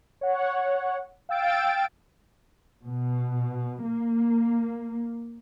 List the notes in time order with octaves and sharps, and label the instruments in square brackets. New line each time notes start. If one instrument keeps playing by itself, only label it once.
[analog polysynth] C#5 F#5
F5 G5 E6 A6 D7
[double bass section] B2
A#3